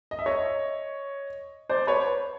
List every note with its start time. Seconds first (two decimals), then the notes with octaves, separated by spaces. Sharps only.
0.11 D#5
0.19 E5
0.26 C#5 D#5
1.69 C5 D5
1.87 B4 C#5